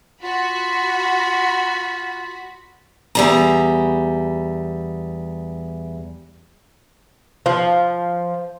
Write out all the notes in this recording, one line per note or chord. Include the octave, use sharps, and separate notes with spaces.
F4 F#4 B5
E2 G3 A#5
F3